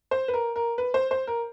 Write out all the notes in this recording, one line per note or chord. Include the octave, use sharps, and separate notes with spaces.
C5
B4
A#4
A#4
B4
C5
C5
A#4